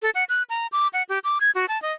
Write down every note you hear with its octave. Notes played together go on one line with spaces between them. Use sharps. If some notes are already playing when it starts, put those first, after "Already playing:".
A4
F#5
F#6
A#5
D6
F#5
G4
D6
G#6
F#4
A5
D#5